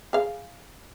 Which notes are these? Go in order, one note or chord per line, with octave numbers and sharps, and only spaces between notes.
G#4 F5